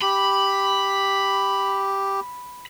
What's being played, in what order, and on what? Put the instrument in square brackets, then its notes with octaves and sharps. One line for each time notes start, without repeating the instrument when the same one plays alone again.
[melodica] G4 [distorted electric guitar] B5